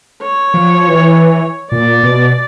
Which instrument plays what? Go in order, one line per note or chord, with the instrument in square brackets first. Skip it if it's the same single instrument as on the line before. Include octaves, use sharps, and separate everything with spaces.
[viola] C#5
[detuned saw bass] F3
E3
[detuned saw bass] A#2 [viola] D5
[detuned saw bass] B2